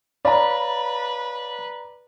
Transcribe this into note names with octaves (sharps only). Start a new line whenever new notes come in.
B4 C#5 D5 F5 A#5 B5